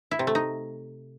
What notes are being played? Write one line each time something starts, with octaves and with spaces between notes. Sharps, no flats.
E4
C3
A3
D#4